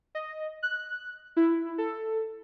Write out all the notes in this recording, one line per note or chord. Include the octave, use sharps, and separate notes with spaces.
D#5
F#6
E4
A4